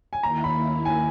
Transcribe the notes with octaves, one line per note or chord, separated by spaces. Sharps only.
G#5
D#2 D#3 A#3 E4 A#5
B5
G#5